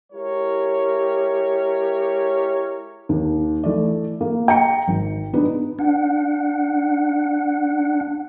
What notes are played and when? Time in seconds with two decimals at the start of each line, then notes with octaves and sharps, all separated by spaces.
0.12 G#3 E4 G4 A#4 C#5
3.09 D#2
3.64 E3 A3 D5
4.21 A#3
4.48 G5 A#5 C#7
4.88 G#1
5.33 B3 D4 D#4 B4
5.79 D4 F#5